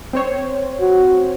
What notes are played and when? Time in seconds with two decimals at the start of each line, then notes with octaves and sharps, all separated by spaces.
0.13 C4 C5 C#5
0.80 F#4